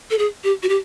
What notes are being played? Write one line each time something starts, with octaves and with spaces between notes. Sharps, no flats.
A4
G#4
G4
F#4
G4